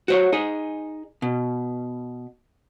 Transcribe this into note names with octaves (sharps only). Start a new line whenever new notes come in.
F#4 C5 C#5
D#4 G#4
B2